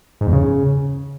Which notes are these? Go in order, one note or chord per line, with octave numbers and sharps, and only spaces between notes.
G#2
E2
C#3